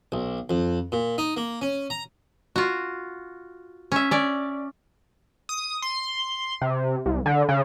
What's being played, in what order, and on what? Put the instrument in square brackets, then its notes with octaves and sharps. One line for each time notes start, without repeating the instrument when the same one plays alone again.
[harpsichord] B1
F2
A#2
D#4
A#3
C#4
A#5
[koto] F4 F#4
C#4 E5
C#4 D5
[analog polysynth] D#6
C6
C3
C2
D3
C#3